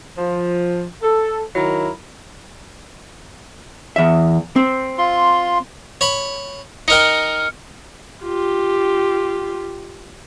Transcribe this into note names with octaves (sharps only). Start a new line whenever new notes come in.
F3
A4
D#3 F#3 E4 A#4
E2 E5
C4
F4 C6
C#5 B5
D#4 A#4 G5 F6 C#7
F4 G4